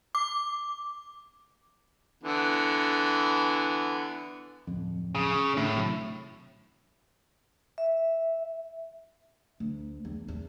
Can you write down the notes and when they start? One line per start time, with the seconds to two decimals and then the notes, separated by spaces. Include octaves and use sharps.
0.15 D6
2.23 D3 E3 B3
4.67 D1 F2
5.15 C#3
5.57 A2 D3
5.73 G#1 C3 F#3
7.78 E5
9.60 D2
10.05 E2
10.28 E2